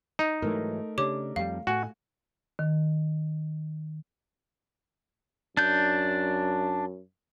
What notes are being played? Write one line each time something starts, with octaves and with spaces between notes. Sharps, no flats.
D#4
G#2 E3 F#3 A3 A#4
C#3 D4 G4 C#5 D6
F2 G3 F5
A2 A3 F#4 G#5
D#3
F#2 D4 G6